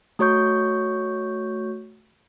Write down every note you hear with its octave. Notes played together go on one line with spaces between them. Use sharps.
A3 F#4 C#5 C#6 G6